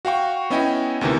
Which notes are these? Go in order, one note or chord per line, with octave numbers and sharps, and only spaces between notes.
F#4 F5 G5 C#6
B3 C#4 E4 D#5 G5 G#5
D2 C3 D#3 E3